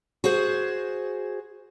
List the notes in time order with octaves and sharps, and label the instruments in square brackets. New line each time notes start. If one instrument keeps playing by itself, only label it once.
[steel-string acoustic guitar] F#4 G#4 C5